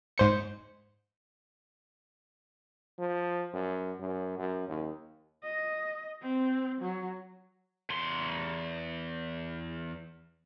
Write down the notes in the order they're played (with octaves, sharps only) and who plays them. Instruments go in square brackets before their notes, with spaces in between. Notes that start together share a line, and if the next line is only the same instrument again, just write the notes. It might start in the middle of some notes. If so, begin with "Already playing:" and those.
[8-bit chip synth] G#2 C5 C#7
[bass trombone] F3
F#2
F#2
F#2
D#2
[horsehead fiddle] D#5
C4
F#3
[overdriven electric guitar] E2 C6